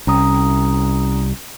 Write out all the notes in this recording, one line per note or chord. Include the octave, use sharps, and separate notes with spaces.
C2 C#4 A#5 D#6